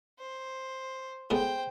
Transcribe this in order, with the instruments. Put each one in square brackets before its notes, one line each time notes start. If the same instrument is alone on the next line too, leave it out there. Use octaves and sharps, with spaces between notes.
[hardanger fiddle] C5
[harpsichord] A2 G#3 B3 [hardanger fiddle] C5 G5